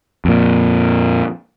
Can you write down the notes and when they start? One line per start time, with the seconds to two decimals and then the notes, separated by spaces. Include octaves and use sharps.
0.25 F2 A#2